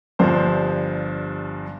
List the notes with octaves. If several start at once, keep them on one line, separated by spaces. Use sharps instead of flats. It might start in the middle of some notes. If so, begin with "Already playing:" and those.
G1 G2 F3 C5